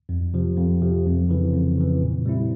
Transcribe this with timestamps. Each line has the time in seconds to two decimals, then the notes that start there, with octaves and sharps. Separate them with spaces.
0.09 F2
0.34 C3 F3
0.57 F2
0.82 C3 F3
1.06 F2
1.29 C#3 E3
1.53 F2
1.77 C#3 E3
2.02 A#2
2.26 G3 C4 E4